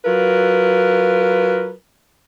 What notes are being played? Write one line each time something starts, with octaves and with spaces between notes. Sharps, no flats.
F#3 F4 A#4 B4